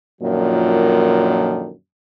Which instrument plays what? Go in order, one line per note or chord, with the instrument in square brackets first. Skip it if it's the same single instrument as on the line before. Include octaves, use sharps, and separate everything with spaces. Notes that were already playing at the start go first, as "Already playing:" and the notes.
[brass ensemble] F#2 A#2 D3 D#3 F3